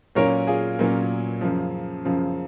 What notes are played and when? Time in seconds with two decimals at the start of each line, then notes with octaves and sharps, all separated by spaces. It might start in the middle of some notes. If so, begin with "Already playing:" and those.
0.15 A#2 F#3 A#3 C#4 A#4 C#5
0.47 F4 G#4
0.79 A#2 F#3 A#3 C#4
1.41 F#2 C#3 F3
2.05 F#2 C#3 F3